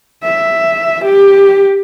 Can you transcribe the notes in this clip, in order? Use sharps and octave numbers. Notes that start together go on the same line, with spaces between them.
E5
G4